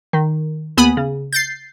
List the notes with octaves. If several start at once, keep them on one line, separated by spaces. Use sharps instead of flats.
D#3
D#2 B3 G#5 B5 D#6
C#3
G6 A6 C7